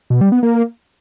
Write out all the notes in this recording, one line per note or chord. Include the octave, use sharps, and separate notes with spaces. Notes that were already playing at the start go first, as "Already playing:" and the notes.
B2
G3
B3
A#3